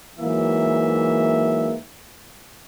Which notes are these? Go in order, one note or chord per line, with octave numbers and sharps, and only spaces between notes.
G#2 E3 F#3 A#3 E5